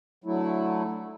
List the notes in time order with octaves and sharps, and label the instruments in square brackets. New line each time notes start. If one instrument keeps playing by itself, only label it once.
[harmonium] D3 F#3 A3 E4